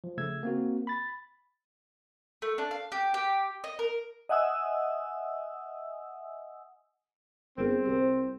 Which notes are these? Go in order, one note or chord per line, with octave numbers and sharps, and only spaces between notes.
F3
C#3 A3 E6 G#6
A#3 C4 F#4
B5 A6
A3
D4
F5
G4
G4
D#5
A#4
D#5 E5 F#5 G#5 D#6 E6
G1 C4 G#4 A#4
C2 G4 A#4 C5